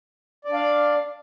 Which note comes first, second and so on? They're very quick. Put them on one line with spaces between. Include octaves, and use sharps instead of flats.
D5 D4 F5